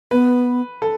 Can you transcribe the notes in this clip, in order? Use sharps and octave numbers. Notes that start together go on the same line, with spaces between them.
B3 B4
A4